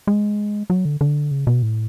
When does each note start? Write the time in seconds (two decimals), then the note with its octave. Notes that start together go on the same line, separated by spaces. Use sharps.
0.07 G#3
0.70 F#3
0.85 D3
1.01 D3
1.31 C#3
1.47 B2
1.63 A2